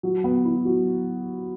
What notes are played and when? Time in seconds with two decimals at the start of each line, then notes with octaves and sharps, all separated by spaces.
0.03 F#3
0.24 B3
0.45 E4
0.65 F#3